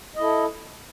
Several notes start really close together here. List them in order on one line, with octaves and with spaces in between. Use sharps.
D#5 E4 A4